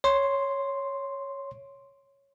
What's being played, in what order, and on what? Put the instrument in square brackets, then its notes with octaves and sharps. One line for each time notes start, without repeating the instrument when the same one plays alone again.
[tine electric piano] C#5 C6